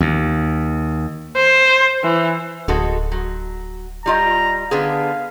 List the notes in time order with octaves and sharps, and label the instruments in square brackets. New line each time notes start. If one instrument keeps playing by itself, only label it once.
[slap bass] D#2
[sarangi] C5
E3
[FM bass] D1 [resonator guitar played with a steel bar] G#3 F#4 A4
[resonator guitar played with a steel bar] F#3
[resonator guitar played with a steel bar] G3 F4 D#5 [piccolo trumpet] A#5
[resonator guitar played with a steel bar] D3 B3 G#4 [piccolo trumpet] F5